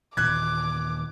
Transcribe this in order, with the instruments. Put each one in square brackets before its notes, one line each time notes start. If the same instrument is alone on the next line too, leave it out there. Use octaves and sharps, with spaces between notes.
[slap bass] D#2 A#2 E3 [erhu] D6 [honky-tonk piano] F#6 G#6